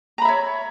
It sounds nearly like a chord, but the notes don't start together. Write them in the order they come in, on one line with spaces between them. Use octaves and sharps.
A#5 B5 E5 C#5